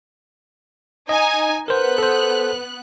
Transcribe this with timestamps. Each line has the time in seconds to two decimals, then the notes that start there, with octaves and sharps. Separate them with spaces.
1.09 D#4 D#5 G#5
1.68 B3 A#4 C5 F#6
1.98 A4 C5